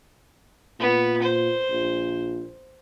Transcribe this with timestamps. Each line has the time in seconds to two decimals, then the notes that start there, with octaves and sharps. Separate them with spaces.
0.80 A#2 B3
1.23 C5
1.71 A#1